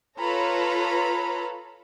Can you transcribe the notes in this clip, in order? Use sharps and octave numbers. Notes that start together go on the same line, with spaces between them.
F4 A4 B4 C#5 A#5 B5